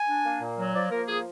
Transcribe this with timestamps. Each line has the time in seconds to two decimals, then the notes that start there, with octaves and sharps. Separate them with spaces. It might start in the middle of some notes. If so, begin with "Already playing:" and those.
Already playing: G#5
0.09 D4
0.25 A#3
0.41 A#2
0.58 F#3
0.74 F3 D5
0.91 A#3 A#4
1.08 F3 G#4